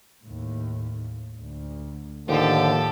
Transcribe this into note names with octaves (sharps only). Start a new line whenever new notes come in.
D#2 A2
D2
D#2 A2 D3 F3 G4 A4